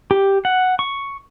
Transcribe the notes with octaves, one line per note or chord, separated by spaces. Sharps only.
G4
F#5
C#6